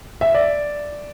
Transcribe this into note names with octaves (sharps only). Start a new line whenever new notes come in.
E5
D5